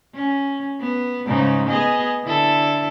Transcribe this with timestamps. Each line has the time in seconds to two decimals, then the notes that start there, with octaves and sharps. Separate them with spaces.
0.15 C#4
0.80 B3
1.27 G#2 C#3 D#4
1.68 B3 G#4 D#5
2.23 D3 E4 A4